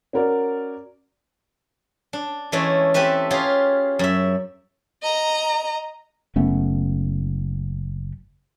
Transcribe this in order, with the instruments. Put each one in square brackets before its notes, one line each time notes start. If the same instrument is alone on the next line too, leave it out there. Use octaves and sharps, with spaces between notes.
[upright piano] C#4 F#4 A#4 D5
[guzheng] D4
E3 G#3 A3 C#4 D5 E5
C4 G4 A4 B4 E5
C#4 F4 G4 G#4
F#2 E5
[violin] D#5 A#5
[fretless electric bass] F#1 A3 B3 C#4